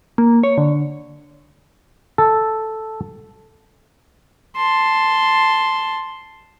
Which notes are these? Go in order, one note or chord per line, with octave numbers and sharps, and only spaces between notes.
A#3
C#5
D3
A4
A5 C6